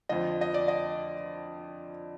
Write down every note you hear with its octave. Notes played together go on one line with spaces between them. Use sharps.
F2 D3 F3 D#5
D#5
D5
D#5